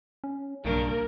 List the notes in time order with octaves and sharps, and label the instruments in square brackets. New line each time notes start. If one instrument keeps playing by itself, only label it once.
[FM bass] C#4
[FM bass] B1 [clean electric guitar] G2 C#3 D4 [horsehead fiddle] A#3 A#4